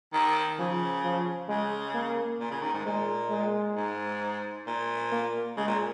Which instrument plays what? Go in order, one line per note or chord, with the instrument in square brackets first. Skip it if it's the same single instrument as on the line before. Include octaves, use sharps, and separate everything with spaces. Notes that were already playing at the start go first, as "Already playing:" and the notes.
[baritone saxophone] D#3
[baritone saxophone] C#3 [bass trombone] F3
[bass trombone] F3
[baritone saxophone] C#3 [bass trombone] G#3
[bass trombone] A#3
[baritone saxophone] A#2
C#3
D#3
G#2
[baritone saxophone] A#2 [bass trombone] G#3
[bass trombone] G#3
[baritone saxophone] G#2
A#2
[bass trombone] A#3
[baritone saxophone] C#3 [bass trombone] G#3
[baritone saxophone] A#2